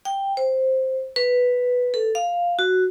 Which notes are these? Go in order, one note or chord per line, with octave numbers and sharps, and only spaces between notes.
G5
C5
B4
A4
F5
F#4